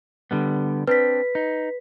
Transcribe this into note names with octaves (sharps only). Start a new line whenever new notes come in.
D3 G3 B3
C4 D4 B4 B6
D#4